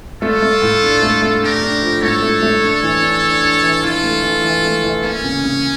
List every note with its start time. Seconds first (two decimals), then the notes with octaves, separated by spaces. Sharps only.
0.22 A3 F4 A4
0.43 A3
0.62 A2
0.83 D4
1.03 A3
1.22 A3
1.42 D4 G4 A#4
1.63 D4
1.82 F3
2.02 A2 A4 C#5
2.23 A3
2.43 A3
2.63 D4
2.83 E3
3.02 D4
3.22 D4
3.43 D4
3.63 E3
3.83 E3 F4 A4
4.04 A3
4.24 E3
4.44 E3
4.63 A3
4.84 E3
5.03 A#3 C#4
5.24 C#3
5.44 C#3